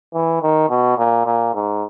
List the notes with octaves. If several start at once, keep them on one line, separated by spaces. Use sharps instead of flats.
E3
D#3
B2
A#2
A#2
G#2